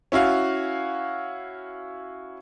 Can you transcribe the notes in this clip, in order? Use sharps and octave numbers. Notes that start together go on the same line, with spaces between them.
C#4 E4 F#4 F5